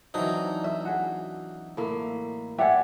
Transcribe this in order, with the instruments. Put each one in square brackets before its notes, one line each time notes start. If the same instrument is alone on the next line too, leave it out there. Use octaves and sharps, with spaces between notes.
[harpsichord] E3 D#4 [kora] F#3 C4 D4
[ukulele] E5
F#4 G#4
[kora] A2 A#3 E5
[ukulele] G4 D5 F#5 [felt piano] E5 G#5